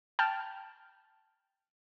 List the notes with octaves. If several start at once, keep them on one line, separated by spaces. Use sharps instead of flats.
G5 A5 F6